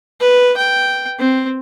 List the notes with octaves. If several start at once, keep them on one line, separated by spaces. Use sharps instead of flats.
B4
G5
C4